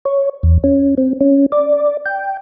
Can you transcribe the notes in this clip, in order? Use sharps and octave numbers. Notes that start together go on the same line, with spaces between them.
C#5
E2
C#4
C4
C#4
D5
G5